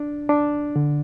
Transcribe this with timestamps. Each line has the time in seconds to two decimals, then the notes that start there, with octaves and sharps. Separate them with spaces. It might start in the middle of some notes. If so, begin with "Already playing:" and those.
Already playing: D4
0.29 D4
0.76 D3